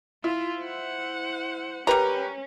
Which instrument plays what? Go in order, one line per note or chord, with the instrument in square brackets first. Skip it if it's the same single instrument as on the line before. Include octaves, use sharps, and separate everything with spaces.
[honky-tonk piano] E4 [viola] F4
[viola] C5 F#5
[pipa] G3 A#5 [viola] C#4 [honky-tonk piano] G4 A#4 B4